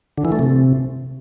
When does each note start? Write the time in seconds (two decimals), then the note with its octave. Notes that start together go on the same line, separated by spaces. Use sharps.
0.18 D3
0.25 E3
0.32 A3
0.39 C3